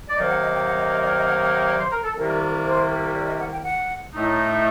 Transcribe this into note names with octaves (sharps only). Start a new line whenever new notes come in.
D5
C3 D#3 F#3 A#3 D#4 D#5
F#5
D#5
G5
F#5
D#5
D#5
D5
D#5
F#5
G5
F#5
D5
C5
A#4
A4
C2 C3 D#3 G3 A#3 A#4
C5
D5
D#5
F#5
G5
F#5
A2 A3 D#4